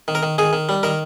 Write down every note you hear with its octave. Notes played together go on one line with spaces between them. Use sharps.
D#3
A#4
D#3
D#3 G#4
D#3
G3
D#3 A#4